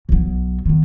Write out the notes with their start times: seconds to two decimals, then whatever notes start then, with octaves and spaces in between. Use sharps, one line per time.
0.09 B1 F#3
0.66 D#3 B3